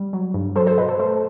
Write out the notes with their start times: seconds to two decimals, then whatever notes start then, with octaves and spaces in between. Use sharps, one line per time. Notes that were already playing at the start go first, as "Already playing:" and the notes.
Already playing: G3
0.13 F#3
0.34 G2
0.56 F#3 A4 C5
0.67 A4 C5
0.77 B2 B4 D#5
0.89 A4 C5
0.99 A3 A4 C5